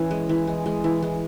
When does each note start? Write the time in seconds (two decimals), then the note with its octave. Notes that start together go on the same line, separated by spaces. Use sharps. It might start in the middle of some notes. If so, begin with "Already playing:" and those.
Already playing: E3 C#4
0.11 G#3
0.29 E3
0.47 G#3
0.66 G#3
0.84 E3
1.02 G#3